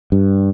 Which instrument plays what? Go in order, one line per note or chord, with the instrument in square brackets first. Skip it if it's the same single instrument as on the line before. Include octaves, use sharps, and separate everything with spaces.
[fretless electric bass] G2